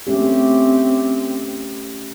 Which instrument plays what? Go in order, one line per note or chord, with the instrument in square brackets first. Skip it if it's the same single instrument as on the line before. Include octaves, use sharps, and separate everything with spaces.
[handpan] A3 C#4 G4 [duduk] C4